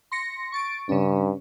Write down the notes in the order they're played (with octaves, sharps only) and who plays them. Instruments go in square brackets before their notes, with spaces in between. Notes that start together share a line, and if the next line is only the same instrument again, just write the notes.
[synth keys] C6 A#6 C#7
C#6 A6 D7
[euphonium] G2 [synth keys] C#3 C#4